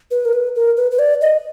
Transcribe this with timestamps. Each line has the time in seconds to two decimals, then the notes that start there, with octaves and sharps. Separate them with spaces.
0.11 B4
0.25 A#4
0.33 B4
0.56 A#4
0.77 B4
0.91 B4
0.99 D5
1.21 D#5